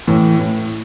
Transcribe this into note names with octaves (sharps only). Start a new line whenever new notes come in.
A2 E3
A2